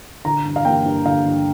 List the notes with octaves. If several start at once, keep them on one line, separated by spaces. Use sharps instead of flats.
D3 A#5
G2
F5
A#3 G5
G2
D3 F5
G2